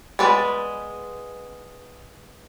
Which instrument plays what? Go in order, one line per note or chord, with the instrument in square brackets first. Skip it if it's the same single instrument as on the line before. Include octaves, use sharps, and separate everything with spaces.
[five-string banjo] G#3 B3 B4 D5